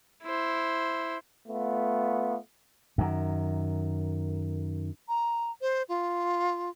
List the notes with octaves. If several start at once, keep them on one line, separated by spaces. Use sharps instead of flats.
E4 C5
A3 B3 F4
F#2 D#3
A#5
C5
F4